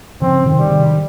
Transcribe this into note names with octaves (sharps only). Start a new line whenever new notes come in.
C#3 F3 C4
C3 D#3
G3
C3 D#3